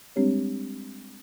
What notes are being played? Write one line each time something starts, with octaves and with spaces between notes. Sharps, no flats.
G3 G#3 C4 D4 G4 C#5